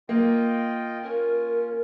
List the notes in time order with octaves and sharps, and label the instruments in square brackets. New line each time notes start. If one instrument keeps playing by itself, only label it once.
[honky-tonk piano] A#3 [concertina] F4 D#5 G5
[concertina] C#4 F4 [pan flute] A#4